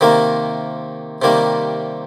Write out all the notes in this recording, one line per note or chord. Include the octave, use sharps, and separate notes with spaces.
C3 D#3 A#3
C3 D#3 G3 A#3